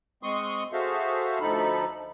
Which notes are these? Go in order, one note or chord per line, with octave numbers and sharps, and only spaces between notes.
G#3 C4 C6 C#6 D#6
F#4 G#4 A4 C5 E5 F5
D2 F3 D#4 A4 B5